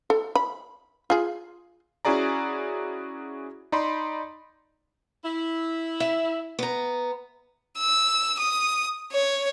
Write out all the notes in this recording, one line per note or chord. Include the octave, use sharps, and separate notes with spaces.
A4
B5
F4 G#4
C#4 E4 F#4 G#4 D5 A#5
D#4 D5 B5 C6
E4
E5
B3 A#5
E6
D#6
C#5